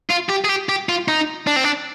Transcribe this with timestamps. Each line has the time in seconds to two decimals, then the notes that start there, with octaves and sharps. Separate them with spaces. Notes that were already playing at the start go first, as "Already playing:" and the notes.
0.10 F4
0.29 G4
0.45 G#4
0.49 G4
0.69 G4
0.89 F4
1.08 D#4
1.47 D4
1.56 C4
1.64 D4